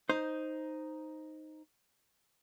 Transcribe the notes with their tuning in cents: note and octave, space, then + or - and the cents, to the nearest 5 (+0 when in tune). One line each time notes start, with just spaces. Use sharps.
D#4 +0 C5 +0